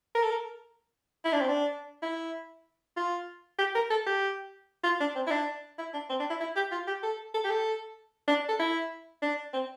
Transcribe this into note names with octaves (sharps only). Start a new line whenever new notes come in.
A#4
A4
A#4
E4
D4
C4
D4
E4
F4
G4
A#4
A4
G4
F4
D4
C4
E4
D4
E4
D4
C4
D4
E4
E4
G4
F4
G4
A4
A4
G4
A4
D4
A4
E4
D4
C4